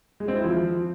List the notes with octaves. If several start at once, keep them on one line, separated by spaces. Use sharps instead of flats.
G#3
C4
E4
F3